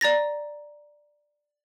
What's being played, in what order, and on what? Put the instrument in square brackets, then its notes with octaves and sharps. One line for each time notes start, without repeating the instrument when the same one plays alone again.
[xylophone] D5 A#5 A6 A#6